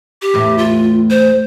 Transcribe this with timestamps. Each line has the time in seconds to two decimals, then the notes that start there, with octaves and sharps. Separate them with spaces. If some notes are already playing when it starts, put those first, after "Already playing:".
0.22 G4
0.34 E2 A2
0.58 F4
1.10 C5